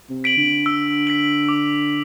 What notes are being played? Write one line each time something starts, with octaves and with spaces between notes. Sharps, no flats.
C3
B6 D7 F#7
D3
E6
B6 D7 F#7
D6